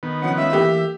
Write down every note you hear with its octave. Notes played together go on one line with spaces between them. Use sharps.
D#3 B3
C#3 F3 C#4 F#5
G#3 C#4 F4 E5
E3 A3 A#3 G4